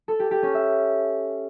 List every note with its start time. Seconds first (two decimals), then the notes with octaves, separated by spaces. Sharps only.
0.08 A4
0.20 G4
0.31 G4
0.43 C#4
0.54 E5